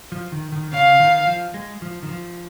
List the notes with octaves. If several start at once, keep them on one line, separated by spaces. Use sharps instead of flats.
F3
D#3
D#3
C#3 F5
D#3
F3
G#3
F3
D#3
F3